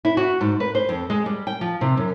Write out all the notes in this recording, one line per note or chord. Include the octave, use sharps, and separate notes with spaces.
E4
F#4
G#2
B4
C5
F2
G#3
G3
G5
F3
C3
F#2